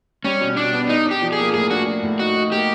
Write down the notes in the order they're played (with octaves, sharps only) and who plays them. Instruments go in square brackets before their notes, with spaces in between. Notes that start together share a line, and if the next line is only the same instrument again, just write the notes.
[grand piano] G3 [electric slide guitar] C#4
[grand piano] B2
[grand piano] B2 [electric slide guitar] D4
[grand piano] B3
[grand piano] D4 [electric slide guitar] D#4
[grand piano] D4
[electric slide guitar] G4
[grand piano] F3
[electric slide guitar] G#4
[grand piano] A#3
[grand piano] A2 [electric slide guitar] G#4
[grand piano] D4 [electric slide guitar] F#4
[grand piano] D4
A2
[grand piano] D#4 [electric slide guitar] F#4
[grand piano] D#4
[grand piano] A#3 [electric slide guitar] G4